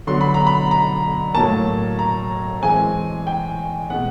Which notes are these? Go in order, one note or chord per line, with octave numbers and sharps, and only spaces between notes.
D3 F#3 B3 C6
B5
A#5
B5
A#5
A2 F#3 A#3 A5
A#5
E3 G#3 C4 G#5
G5
B2 G#3 B3 F#5